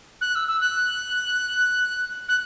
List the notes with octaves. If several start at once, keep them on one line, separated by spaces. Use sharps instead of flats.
F#6
E6
E6
F#6
F#6